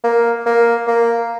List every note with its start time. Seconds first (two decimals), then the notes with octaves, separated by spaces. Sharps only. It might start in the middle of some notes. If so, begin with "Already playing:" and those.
0.04 A#3
0.46 A#3
0.87 A#3